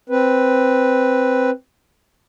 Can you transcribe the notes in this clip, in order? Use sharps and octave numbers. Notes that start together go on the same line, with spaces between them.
C4 B4